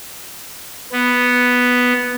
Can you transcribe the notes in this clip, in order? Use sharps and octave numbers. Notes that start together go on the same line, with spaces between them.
B3